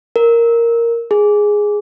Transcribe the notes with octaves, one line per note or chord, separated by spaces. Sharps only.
A#4
G#4